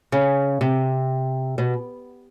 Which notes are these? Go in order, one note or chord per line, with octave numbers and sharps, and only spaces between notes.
C#3
C3
B2